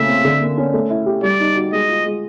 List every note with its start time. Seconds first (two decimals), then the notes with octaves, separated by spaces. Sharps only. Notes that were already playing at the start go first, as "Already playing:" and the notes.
Already playing: A#2 C#3 A3 E5
0.08 C4
0.25 D3
0.41 A#3
0.58 C#4
0.74 A3
0.90 E4
1.06 G4
1.23 G3 D5
1.40 D#4
1.56 F#4
1.72 G#3 D#5
1.89 F4
2.06 G#3